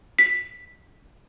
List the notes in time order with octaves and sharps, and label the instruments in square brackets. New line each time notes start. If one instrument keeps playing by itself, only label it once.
[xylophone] B6